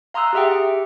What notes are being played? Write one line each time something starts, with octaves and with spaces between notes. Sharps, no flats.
F5 A#5 C6 D#6 E6 F#6
G4 G#4 E5 F#5 G5